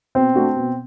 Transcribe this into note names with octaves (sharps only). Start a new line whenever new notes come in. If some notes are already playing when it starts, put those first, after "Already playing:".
B2 C4
A3 D4 F#4
B2